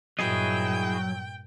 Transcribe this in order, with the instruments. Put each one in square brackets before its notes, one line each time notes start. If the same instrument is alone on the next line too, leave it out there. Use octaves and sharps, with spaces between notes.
[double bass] G2 A#2 [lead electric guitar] F#3 [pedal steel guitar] E4 G#4 D#5 [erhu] G5